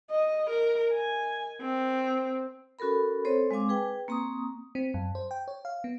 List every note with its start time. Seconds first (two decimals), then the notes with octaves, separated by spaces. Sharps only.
0.11 D#5
0.49 A#4
0.93 G#5
1.61 C4
2.79 C#4 F#4 A4 A#4 B5
3.25 C4 A4 C5 C#5
3.51 G#3 C4 F5 G#5 D6
3.69 G#4 B4 G5
4.08 A#3 C4 A#5 C#6 D#6
4.75 C4
4.94 F#2
5.15 C5
5.31 G5
5.48 C#5
5.65 F5
5.84 B3